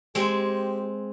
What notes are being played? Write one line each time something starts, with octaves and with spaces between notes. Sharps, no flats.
G#3 C4 G4